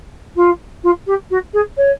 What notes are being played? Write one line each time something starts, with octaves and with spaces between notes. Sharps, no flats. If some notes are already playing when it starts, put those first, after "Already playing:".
F4
F4
G4
F#4
G#4
C#5